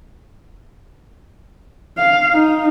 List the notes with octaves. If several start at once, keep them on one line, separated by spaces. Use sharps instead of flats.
F5
D#4